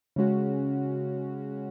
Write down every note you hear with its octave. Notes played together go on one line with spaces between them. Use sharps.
C#3 G#3 C#4 F#4